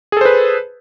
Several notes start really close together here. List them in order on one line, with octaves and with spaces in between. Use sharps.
G#4 A4 C5 B4